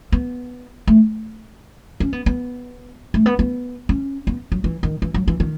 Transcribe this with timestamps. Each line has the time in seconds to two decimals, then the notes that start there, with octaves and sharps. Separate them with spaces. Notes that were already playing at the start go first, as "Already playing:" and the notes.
0.12 B3
0.87 A3
2.00 C#4
2.13 B3
2.26 B3
3.14 A3
3.26 B3
3.39 B3
3.89 C#4
4.27 B3
4.52 F#3
4.64 E3
4.83 D#3
5.02 E3
5.14 F#3
5.28 E3
5.40 D#3